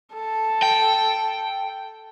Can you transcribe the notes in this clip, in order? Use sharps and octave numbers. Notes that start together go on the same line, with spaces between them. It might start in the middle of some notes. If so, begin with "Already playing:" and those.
A4
G5